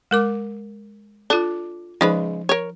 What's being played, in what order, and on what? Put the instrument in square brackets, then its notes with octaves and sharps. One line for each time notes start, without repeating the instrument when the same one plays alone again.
[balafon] G#3 A#4 D6
[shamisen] D4 [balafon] F4 A4
[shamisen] C#3 G#3 B4 [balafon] F3 D#4 C5
[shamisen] A#4 C#5